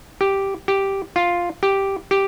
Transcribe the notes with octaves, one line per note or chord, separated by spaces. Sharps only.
G4
G4
F4
G4
G4